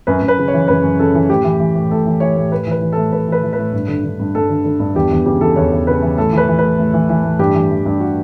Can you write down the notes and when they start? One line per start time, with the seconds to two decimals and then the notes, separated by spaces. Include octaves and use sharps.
0.07 F#2 B4
0.22 F#2
0.28 B4
0.39 C#3
0.48 C#5
0.54 E3
0.68 F#2 B4
0.83 F#2
1.00 C#3 A4
1.15 E3
1.29 A2 G4
1.44 E3
1.59 E3
1.75 A2
1.91 A2 A4
2.06 E3
2.20 E3 C#5
2.36 A2
2.52 A2 B4
2.67 E3 B4
2.81 E3
2.92 A2 A4
3.12 A2 B4
3.27 E3 B4
3.43 E3
3.53 A2 B4
3.73 G2
3.88 D3
4.03 D3
4.19 G2
4.35 G2 A4
4.49 D3
4.65 D3
4.79 G2
4.95 E2 G4
5.11 E2
5.26 C#3 G4
5.41 E3 A4
5.56 E2 C#5
5.72 E2
5.87 C#3 B4
6.02 E3
6.17 A2 A4
6.33 E3 B4
6.48 E3
6.59 A2 B4
6.79 A2
6.94 E3
7.09 E3
7.23 A2
7.39 G2 G4
7.54 E3
7.70 E3
7.86 G2
8.00 F#4